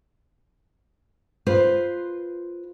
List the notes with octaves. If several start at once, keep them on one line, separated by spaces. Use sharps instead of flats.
F4 B4 C5